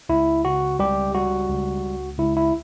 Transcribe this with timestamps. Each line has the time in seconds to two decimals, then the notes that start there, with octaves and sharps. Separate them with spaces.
0.09 C#2 E4
0.45 C#3 F#4
0.79 C#2 G3 G4
1.15 G3 F#4
1.49 C#2
1.84 C#2
2.19 C#2 E4
2.37 E4